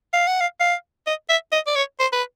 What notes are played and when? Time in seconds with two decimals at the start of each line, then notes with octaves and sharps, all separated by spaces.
0.13 F5
0.27 F#5
0.40 F5
0.60 F5
1.07 D#5
1.29 E5
1.52 D#5
1.67 D5
1.75 C#5
2.00 C5
2.12 B4